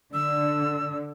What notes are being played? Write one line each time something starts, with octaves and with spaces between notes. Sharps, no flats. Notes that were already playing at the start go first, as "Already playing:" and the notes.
D3 E6